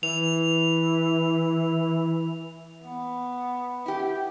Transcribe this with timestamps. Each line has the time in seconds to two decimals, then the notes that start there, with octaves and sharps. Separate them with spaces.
0.03 E3 F7
2.83 B3
3.86 E4 G4